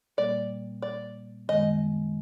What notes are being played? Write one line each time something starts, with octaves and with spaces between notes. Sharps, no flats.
A#2 G3 A#3 D5
D5
F#2 D#3 G#3 B3 D#5